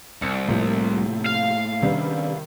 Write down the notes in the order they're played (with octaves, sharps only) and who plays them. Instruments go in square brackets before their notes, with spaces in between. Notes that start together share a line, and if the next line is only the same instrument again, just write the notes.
[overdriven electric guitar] C2 [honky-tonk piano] C#7
[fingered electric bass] A2 A3 A#3 [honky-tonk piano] C3 F3
[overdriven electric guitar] F5
[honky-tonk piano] C3 G3 B3 [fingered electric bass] D#3 C#4 D4